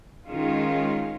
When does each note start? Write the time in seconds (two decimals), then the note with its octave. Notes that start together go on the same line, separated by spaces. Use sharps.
0.26 D#3 G#3 C#4 F4